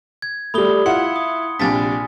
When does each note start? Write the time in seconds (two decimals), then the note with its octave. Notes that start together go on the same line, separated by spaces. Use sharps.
0.22 G#6
0.54 G3 A3 B5 D#6 G7
0.86 E4 F4 F#5 C6 C#7
1.16 D#6
1.59 A#1 C3 D4 G#5 A6 B6